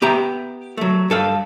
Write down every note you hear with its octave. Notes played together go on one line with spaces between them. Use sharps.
B3 G4 E5 A#5
F#3 A3
G2 A4 F5